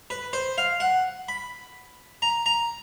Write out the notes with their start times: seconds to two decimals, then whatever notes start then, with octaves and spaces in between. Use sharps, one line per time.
0.10 B4
0.33 C5
0.58 F5
0.80 F#5
1.28 B5
2.22 A#5
2.46 A#5